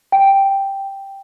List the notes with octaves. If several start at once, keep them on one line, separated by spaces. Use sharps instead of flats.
G5